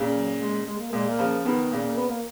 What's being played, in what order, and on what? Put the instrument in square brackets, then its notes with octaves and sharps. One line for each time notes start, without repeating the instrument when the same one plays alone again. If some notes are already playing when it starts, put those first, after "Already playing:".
Already playing: [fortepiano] A#2 C#3
[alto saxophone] F#3
G#3
G#3
A#3
[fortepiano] A#2 [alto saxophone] G#3
[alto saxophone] A#3
[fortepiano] C#3 F3
[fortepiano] B2 D#3 [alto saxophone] B3
[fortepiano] A#2 C#3
[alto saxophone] A#3
B3
A#3